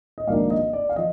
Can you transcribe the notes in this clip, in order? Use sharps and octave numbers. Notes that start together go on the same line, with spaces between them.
D#5
G#1 G#2 F3 A#3 D4 D5 F5
D#5
D5
F5
F3 D#5